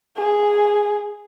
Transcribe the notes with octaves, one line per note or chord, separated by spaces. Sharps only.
G#4